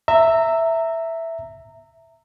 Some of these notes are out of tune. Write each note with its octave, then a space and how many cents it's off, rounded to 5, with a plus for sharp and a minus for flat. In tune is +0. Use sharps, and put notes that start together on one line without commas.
E5 +0 A#5 -25